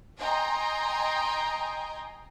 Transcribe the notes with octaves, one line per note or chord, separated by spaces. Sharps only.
D#5 G5 G#5 A#5 C6